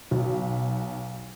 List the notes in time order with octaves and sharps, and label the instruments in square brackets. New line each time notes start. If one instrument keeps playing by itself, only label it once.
[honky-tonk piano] B1